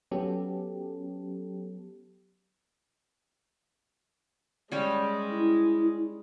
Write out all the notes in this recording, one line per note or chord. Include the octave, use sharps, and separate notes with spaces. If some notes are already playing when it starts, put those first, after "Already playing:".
F#3 B3 C#4 G4 A4
G3 G#3 C#4 G4
E4